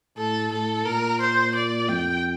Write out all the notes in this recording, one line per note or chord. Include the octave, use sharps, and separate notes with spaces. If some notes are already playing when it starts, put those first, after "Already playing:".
A2 A4
A2 A4
A#2 A#4
C5
D5
F2 G5